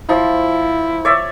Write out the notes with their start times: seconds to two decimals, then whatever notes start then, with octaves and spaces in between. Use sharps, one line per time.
0.09 F3 E4
1.05 C#5 D5 E5